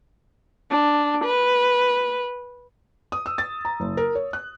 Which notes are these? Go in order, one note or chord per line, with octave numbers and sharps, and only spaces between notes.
D4
B4
D#6
E6
A6
A#5
F#1
A#4
C#5
F#6